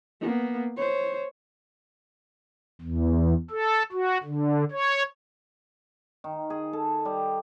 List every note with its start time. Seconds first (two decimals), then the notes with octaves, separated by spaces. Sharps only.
0.21 A#3 B3
0.77 C5 C#5
2.81 E2
3.50 A4
3.92 F#4
4.24 D3
4.72 C#5
6.24 D#3
6.50 G#4
6.73 A4
7.05 G3